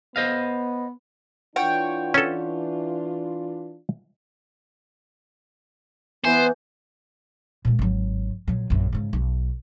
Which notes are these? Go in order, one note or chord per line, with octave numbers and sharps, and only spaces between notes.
B3 C5 D#5 F5
E3 D4 F4 C#5 F#5 G5
C#4 A4
E3 B3 C5 G#5 G6
A#2 G#3
G#1 F#3
A#2 F#3
A#1 F#2
G#2 C#3
B1